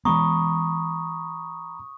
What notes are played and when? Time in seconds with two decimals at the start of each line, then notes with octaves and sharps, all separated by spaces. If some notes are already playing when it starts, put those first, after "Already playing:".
0.05 E3 G#3 B3 A#5 B5 C#6 D#6